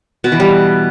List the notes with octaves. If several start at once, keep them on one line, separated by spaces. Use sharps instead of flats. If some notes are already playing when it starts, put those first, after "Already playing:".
B2
E3
G3